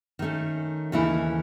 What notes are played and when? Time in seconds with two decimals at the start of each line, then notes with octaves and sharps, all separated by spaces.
0.19 D#3 A3 C#4
0.92 D#2 C#3 E3 A3 E4